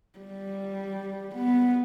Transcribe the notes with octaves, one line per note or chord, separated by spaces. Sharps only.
G3
B3